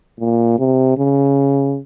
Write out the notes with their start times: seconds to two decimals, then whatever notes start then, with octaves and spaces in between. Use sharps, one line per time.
0.20 A#2
0.59 C3
0.98 C#3